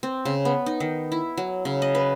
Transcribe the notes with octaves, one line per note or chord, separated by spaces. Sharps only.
C4
C#3
B3
D#4
D#3
E4
F#3
C#3
D#5
B4